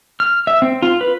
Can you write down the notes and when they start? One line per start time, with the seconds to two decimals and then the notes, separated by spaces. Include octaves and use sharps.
0.20 F6
0.47 E5
0.62 C4
0.82 F4
1.01 B4